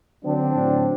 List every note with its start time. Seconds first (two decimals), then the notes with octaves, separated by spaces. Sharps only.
0.24 D3 F#3 C4 D4
0.55 A2 F#3